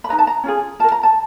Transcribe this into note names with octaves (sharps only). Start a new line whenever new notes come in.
B5
D#4 G#4 B4 A#5
A5
A#5
C#4 F4 G#4
F4 A#4 A5
A#5
A5